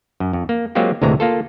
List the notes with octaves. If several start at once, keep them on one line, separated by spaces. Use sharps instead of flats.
F#2
F2
A#3
F#3 G#3 A#3 C4 F4 G4
D2 A2 C3 E3 G#3 A#5
A#3 F4 A4